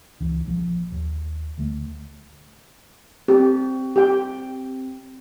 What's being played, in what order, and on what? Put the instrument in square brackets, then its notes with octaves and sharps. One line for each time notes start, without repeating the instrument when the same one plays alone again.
[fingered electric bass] C#2 E3
A#1 F3
D#2
D2 A3
[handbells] C4 [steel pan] G4
[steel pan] G4 G5